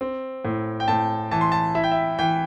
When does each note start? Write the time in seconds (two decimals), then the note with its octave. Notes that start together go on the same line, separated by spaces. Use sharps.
0.01 C4
0.45 A2
0.80 G5
0.88 A2 A5
1.31 E3 A5
1.41 C6
1.52 A5
1.75 E4 E5
1.83 G5
1.92 E5
2.19 E3 G5